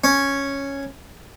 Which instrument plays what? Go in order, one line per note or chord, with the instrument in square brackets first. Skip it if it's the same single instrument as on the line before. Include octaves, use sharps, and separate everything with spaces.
[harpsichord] C#4